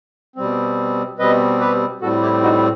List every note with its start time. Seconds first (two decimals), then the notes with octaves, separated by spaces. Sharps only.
0.36 B2 G3 C4
1.19 B2 G3 C4 B4 D#5
1.60 G4 B4
2.01 A2 G3 C4 F#4 A4
2.22 E4 G4
2.43 D#4 F#4